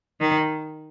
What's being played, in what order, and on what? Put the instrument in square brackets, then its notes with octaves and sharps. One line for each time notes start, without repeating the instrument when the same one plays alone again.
[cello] D#3